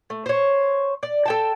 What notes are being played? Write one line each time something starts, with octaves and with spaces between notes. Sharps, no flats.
A3
C5 C#5
D5
A4 G5 A5